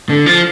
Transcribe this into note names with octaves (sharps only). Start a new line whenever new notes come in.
D3
F3